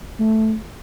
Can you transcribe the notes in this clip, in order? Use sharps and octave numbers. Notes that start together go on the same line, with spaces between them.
A3